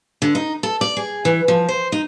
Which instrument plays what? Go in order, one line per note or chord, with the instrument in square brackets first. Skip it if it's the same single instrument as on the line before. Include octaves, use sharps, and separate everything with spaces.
[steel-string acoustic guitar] D3
D#4
A4
D5
G#4
E3
F3
C5
D#4